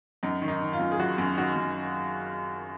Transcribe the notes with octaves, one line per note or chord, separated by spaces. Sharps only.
F#2 D#4
D#3
D#4
D#3
F4
F#2
G#4
F#1 F#4
F#2
D#3 F#4
F#2